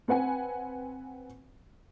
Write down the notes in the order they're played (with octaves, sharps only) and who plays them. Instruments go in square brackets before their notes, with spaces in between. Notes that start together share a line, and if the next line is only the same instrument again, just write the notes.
[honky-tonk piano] C4 B4 F#5 G#5